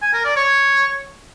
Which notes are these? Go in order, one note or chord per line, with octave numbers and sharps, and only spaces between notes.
G#5
A#4
D5
C#5